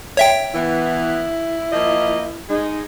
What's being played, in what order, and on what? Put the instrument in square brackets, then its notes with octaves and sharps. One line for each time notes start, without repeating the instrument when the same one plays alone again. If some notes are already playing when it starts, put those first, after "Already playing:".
[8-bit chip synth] C#5 E5 G5
[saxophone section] E3 B3 [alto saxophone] E4
[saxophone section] F3 A#3 D#5
G#3 D#4